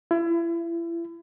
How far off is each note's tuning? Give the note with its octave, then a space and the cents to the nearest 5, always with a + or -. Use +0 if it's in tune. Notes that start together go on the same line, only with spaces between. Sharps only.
E4 +35